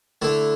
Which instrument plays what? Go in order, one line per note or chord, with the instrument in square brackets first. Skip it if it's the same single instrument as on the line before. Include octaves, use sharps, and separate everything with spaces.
[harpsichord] D3 A3 E4